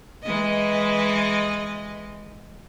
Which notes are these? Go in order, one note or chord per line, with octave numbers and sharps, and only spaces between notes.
E3 G#3 D#5